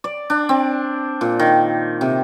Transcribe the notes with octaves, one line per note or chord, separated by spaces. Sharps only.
D5
D4
C4
A#2
D#3
C3